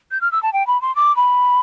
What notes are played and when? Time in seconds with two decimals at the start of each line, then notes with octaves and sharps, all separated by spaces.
0.11 G6
0.21 F6
0.32 E6
0.43 A5
0.53 G5
0.67 B5
0.82 C6
0.96 D6
1.16 B5